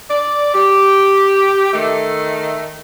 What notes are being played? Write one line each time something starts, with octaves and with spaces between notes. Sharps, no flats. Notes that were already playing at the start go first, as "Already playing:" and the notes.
D5
G4
D#3 A3